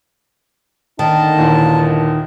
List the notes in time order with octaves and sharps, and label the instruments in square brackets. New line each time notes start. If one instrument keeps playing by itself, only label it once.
[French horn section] D3 A#3 D#4 [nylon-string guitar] D#3 [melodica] A5
[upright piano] D#2 A#2 E3